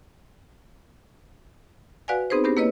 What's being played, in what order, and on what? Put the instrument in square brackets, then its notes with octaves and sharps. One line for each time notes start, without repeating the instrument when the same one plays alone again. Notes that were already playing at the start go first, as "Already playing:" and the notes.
[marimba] F#4 B4 D5 F5 F#5 G#5
B3 C4 D#4 G#4 B4 C5
B3 C4 D4 G4 A#4 C5
A#3 E4 B4 C#5 D#5